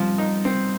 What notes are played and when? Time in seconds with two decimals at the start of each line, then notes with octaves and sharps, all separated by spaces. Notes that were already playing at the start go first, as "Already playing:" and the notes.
Already playing: F3 G3 C4
0.18 D#4
0.45 C4